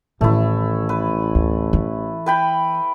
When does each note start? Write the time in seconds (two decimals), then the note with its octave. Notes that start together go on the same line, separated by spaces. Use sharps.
0.21 A1 A2 D#3 A3 E4
0.89 B4
1.35 D2
1.73 E3 E4
2.26 B4 G5 B5